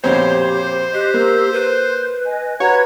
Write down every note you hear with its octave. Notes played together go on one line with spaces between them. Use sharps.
A#1 F2 B2 G4 C5 C#5
G4 D#5 F#6
A#3 A#4 E6
B4 G6
D#5 G#5
F#4 B4 C#5 A#5 G#6